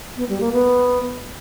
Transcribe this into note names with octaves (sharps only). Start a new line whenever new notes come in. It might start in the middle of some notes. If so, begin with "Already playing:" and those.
B3
G3
A#3
B3